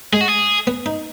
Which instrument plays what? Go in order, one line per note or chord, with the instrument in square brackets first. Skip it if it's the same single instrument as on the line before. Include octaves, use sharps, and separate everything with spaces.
[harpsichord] G#3 [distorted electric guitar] G#4
[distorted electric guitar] F#4
G#4
[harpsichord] B3
D#4